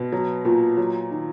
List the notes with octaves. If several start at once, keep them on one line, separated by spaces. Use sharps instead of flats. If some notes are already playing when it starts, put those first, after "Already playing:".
Already playing: B2
F#3
A#2
F#3
D#3